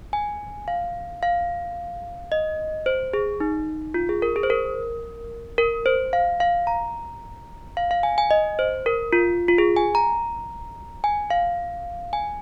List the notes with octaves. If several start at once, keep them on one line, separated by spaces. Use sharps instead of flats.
G#5
F5
F5
D#5
C5
G#4
D#4
F4
G#4
A#4
G#4
C5
A#4
A#4
C5
F5
F5
A#5
F5
F5
G#5
G#5
D#5
C5
A#4
F4
F4
G#4
G#5
A#5
G#5
F5
G#5